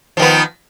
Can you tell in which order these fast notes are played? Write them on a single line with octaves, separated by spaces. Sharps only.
F3 D#3 B3